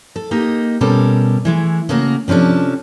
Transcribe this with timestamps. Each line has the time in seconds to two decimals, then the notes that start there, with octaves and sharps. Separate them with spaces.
0.16 A4
0.31 A#3 D#4 G4 D#5
0.81 B2 G3 C#4 G4 A4 A#4
1.45 E3 G#3 A3
1.89 C#3 A3 A#3 F#4 A#4
2.28 C3 F3 C#4 D4 A4